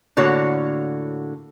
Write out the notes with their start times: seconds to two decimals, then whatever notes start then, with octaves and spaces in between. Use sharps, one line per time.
0.17 A2 D3 A#3 F#4 C#5